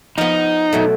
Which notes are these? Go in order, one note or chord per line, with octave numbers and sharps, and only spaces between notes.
F3 B3 D#4
B2 F#3 A3